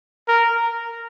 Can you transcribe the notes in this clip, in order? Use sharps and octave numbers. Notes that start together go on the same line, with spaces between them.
A#4